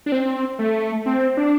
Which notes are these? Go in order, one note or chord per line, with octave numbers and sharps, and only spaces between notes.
D4
C4
A3
C4
D4